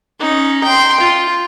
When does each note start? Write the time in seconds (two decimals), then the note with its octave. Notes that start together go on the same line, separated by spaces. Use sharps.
0.20 C#4 D#4
0.64 G5 C6
1.00 F4